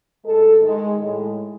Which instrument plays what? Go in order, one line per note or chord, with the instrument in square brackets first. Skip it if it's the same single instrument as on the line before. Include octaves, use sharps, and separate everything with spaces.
[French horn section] A2 G#3 A4
D#3 G#3
A2 G#3